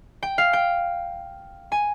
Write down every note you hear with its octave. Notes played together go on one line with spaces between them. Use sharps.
G5
F5
G5
G#5